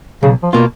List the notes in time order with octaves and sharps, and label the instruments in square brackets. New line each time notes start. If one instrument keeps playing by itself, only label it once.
[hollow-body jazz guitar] B1 [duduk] C#3
[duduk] F3
[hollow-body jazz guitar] B2 A#3 F4